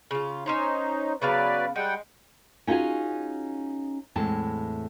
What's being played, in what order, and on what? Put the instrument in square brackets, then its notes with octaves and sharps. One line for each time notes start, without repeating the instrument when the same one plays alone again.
[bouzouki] C#3 F4
[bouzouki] C#4 C5 C#5 [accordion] D#4
[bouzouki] C#3 B3 F5 [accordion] F#3 B4 D5
[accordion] G3 F#5 G5 [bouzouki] G#3
[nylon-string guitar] C#4 D#4 F4 F#4 G#4 G#5
E2 A2 G#3 C4 A5